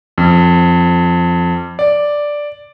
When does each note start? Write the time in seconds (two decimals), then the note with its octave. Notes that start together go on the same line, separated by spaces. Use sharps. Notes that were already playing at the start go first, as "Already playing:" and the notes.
0.18 F2
1.79 D5